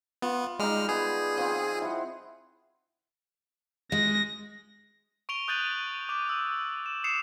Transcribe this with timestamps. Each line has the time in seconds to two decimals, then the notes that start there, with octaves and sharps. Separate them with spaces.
0.22 B3 F4
0.59 G3 G#3 D#4 F6
0.89 B3 G#4
1.38 F3 C4
1.82 E4 C5 F#5
3.92 G#3 A#6
5.29 C#6 D7 F7 G7
5.48 D#6 F#6 G6 A6 D#7 F#7
6.09 D6 F7
6.29 E6
6.86 E7
7.04 D#6 C7 C#7 E7 F7